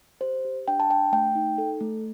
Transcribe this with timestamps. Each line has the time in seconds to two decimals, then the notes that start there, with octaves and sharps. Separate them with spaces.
0.21 G4 C5
0.45 G4
0.68 D4 G5
0.80 A5
0.89 D4 G5
1.12 A3 G5
1.35 D#4
1.58 A4
1.81 A3